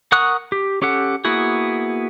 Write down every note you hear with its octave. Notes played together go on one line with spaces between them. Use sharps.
A#4 F#5 C#6 D#6 F#6
G4
C#4 G4 A4 F#5
A#3 B3 E4 F#4 G#4